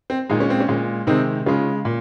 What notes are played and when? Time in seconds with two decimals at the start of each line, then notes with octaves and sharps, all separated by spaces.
0.10 C4
0.30 A#2 G#3 D#4
0.40 C#4
0.50 C4
0.60 C#4
0.68 A#2 G#3
1.07 C3 D#3 G#3 C4 D#4
1.46 C#3 G#3 C#4 F4
1.85 A#2